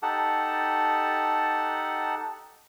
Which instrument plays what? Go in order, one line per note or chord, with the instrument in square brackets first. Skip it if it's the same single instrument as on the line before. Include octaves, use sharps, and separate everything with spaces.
[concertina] D#4 G4 A4 F#5 A5